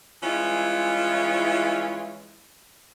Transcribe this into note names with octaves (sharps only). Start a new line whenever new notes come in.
E3 G3 G#3 C#4 E4 F4